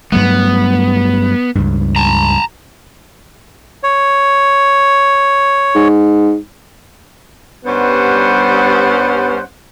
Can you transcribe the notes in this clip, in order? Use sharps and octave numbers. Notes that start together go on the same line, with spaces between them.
G2 F#3 A3 B3
C#2 G2
A5 A#5
C#5
G#2
G2 G3 B3 C#4 C5 F#5